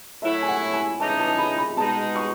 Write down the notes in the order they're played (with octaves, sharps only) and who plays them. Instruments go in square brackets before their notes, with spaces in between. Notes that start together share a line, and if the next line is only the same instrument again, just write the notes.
[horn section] A2 F#3 A3 E4 [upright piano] E5
[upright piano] G#5
F#5
G#5
[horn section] C#3 E3 B3 D#4 [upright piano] A5
[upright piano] A5
B5
B5
[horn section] B2 G#3 D#4 [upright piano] A5
[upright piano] C#6